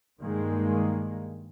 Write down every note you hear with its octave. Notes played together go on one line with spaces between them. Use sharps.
G2 D#3 G#3 A#3